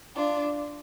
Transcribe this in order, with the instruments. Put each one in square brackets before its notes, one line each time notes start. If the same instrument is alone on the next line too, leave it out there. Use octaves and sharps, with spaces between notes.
[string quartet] D4 F4